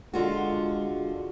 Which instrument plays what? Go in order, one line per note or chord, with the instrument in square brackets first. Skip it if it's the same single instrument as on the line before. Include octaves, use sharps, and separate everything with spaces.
[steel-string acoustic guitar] D3 F4 F#4 [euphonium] G#3